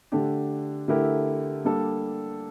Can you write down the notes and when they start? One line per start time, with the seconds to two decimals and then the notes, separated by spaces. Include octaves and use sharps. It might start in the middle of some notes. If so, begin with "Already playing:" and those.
0.12 D3 A3 D4 G4
0.88 D3 A3 E4 G4 A#4
1.65 G3 A#3 D4 A4